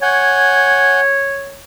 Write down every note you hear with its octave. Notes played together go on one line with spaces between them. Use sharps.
C#5 F#5 G#5 G6